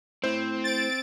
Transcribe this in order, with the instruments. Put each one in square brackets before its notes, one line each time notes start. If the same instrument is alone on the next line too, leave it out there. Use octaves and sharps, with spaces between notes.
[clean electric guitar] A3 E4 E5 [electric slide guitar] C4 [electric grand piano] C5
[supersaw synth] A6 D7